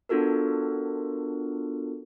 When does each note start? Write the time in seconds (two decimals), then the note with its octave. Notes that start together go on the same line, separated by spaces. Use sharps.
0.09 B3 D4 F4 F#4 A4 A#4